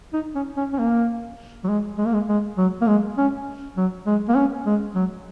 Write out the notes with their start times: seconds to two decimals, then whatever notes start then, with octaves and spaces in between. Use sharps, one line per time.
0.13 D#4
0.35 C#4
0.57 C#4
0.73 C#4
0.79 A#3
1.64 F#3
1.69 G#3
1.98 G#3
2.06 A#3
2.14 G#3
2.29 G#3
2.58 F#3
2.82 A#3
2.87 G#3
3.18 C#4
3.77 F#3
4.06 G#3
4.28 A#3
4.36 C#4
4.66 G#3
4.95 F#3